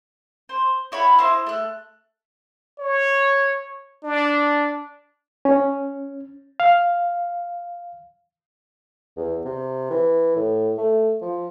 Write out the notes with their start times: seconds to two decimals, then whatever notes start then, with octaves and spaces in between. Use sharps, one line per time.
0.49 C5
0.92 E4 C#5 F#5 B5
1.18 E4 C5 D#5
1.47 A3 F#6
2.79 C#5
4.04 D4
5.45 C#4
6.60 F5
9.17 E2
9.45 C3
9.90 E3
10.36 A2
10.78 A3
11.22 F3